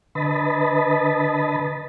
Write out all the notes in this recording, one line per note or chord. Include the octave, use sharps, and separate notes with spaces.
D3 B4 D#5 A5 B5